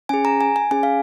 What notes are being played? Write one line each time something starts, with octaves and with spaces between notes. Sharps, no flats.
C#4 G#4 G#5
A#5
G#5
G#5
C#4 G#4 G#5
F5